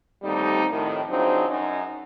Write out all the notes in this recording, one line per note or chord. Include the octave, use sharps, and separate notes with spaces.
D#2 D3 G3 A3 C4 D#4
F2 A2 D#3
C#3 F3 F#3 C4 D4 D#4
F#2 F#3 C#4 D#4